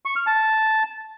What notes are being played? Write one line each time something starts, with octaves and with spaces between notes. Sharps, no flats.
C#6
F6
A5